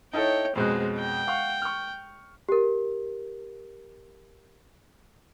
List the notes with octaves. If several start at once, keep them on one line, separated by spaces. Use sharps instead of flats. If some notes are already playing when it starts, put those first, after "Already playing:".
D#4 E4 A4 C#5 G5
F2 B2 G#3 C5 F#6
G5
F5 F#5 C#6
C#6 F6
G4 A#4